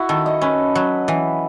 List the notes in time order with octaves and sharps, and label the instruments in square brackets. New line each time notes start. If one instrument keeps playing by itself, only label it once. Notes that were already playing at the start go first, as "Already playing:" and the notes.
Already playing: [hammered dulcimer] E4 F#4
[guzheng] D#3 [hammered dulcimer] A4
[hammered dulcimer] D#5
[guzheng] C#4 [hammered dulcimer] B4
[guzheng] F#3
E3